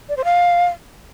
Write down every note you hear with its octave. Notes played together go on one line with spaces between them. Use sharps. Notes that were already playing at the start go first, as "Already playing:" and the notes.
D5
C5
F5